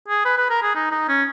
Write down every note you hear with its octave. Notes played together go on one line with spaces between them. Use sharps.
G#4
B4
B4
A#4
G#4
D#4
D#4
C#4